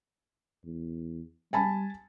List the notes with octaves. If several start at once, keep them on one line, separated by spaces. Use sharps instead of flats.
E2
G3 G#5 A5 B5